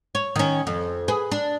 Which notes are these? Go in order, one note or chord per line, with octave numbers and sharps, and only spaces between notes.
C#5
D#3 C#4
F2
G#4 B4
D4